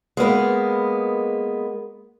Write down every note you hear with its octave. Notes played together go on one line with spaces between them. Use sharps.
G#3 A#3 B3 A#4